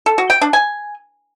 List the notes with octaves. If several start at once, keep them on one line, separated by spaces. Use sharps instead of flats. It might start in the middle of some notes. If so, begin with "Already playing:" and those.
A4
F#4
G5
D4
G#5